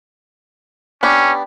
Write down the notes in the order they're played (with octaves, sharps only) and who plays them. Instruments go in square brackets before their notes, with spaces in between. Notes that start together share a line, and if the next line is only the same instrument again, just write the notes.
[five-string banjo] B3 D4 G4 [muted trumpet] C#4